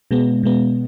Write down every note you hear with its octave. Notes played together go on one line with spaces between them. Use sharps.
B2 G#3 B3
B2 G#3 B3